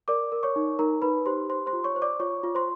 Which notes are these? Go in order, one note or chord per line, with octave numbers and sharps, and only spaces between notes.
A#4 D5 D6
A#4
C#5 C#6
D#4
D#4 A#4 A#5
D#4 B4 B5
G4 C5 C6
C5 C6
C5 C6
F4
C#5 C#6
C5
D5 D6
F4 C#5 C#6
F4
C5 C6